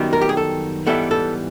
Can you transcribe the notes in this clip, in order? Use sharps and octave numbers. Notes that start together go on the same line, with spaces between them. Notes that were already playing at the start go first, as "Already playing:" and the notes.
Already playing: F#2 D#3 G3 B3
A#4
G4
G#4
A4
G#2 E3 G3 B3 A4
A4